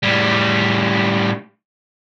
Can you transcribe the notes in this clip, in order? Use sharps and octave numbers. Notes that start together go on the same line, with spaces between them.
A2 G3